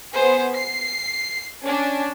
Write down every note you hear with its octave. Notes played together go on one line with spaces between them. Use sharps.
B3 G#4 C5
C7
C#4 D4 G#5